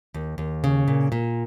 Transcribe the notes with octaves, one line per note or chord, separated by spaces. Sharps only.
D#2
D#2
C#3
A#2
A#2